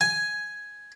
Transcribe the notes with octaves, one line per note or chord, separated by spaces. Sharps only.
G#5